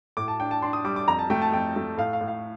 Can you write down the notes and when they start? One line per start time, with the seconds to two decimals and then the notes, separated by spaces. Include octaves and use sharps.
0.17 A2 D6
0.28 A5
0.40 D4 G5
0.51 A5
0.62 D4 C6
0.73 D#6
0.84 G3 D6
0.96 D6
1.08 F2 A#5
1.19 A5
1.30 A3 G5
1.42 A5
1.52 F2 G5
1.76 A3
1.98 A2 F5
2.13 F5
2.21 A2
2.28 F5